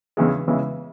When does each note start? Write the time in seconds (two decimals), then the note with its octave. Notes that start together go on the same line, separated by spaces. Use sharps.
0.17 E2 C#3 E3 G#3
0.47 E2 C#3 E3 G#3